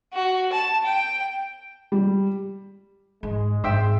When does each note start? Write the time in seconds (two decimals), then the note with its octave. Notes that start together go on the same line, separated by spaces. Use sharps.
0.14 F#4
0.52 A5
0.84 G5
1.92 G3
3.23 G#2 G#3
3.64 G#1 G#2 C5 E5 G5